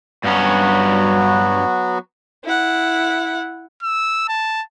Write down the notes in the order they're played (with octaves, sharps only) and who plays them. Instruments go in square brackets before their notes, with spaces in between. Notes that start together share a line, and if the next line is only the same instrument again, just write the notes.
[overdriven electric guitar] G2 C#4 [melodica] F#3 B3 F#4
[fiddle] E4 F#5
[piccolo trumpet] E6
A5